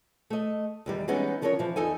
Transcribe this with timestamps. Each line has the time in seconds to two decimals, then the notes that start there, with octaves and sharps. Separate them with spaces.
0.30 A3 D#5
0.86 E2 D#3 G3
1.08 E3 G3 G#3 B3 C#4 D#4
1.42 D3 F3 C#4 A#4 C5 C#5
1.59 E3 F3
1.76 E2 D#4 A4 G#5